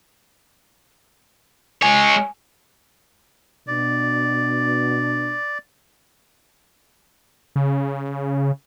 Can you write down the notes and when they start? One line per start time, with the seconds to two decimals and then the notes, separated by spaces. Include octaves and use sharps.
1.83 G#3 C#5 G#5
3.67 B2 D4 D5
7.56 C#3